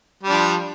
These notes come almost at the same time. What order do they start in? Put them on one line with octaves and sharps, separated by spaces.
G3 D4 F3